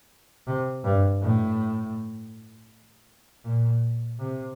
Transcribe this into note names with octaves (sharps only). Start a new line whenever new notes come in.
C3
G2
A2
A#2
C3